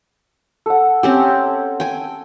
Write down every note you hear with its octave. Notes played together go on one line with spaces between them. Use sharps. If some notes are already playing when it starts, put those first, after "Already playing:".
A4 F#5
C4 C#4 G4
G5 G#5